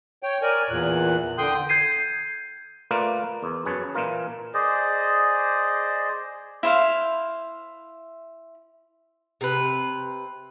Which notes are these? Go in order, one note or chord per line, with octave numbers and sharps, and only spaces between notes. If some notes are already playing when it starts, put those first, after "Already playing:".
C#5 G5
A#4 D5 G#5
E2 A#2 F#6
D3 G5 C6 D#6 G6
G6 G#6 C7 D#7
A3 A#3 F4 A#4 B4 D5
E2
F#2 G#4 B4 C#5 A5
A#2 E3 F4 A#4
G#4 C5 D5 D#5
E4 C5 F5
C3 B4